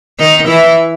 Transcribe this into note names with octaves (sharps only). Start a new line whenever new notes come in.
D#3 D#4
E3 E4